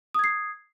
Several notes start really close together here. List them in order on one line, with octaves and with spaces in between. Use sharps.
D#6 G#6 C7